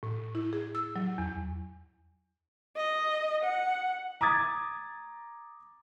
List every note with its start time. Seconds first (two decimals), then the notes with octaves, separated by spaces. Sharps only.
0.03 A2
0.35 E4
0.53 G#4
0.75 E6
0.96 F#3
1.18 E2
2.77 D#5
3.44 F#5
4.21 A#5 D6 D#6 G#6 A6